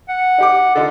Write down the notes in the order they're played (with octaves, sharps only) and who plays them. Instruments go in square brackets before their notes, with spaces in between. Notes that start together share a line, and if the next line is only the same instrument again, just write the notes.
[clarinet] F#5
[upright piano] D#4 G4 D6
[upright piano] D3 D#4 F4 [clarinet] A4